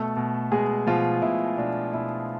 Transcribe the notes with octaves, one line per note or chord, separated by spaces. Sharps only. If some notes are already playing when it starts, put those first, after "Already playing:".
Already playing: B2 A3 A4
B2
B2 G#3 G#4
B2 F3 F4
B2 E4
B2 D4
B2 E4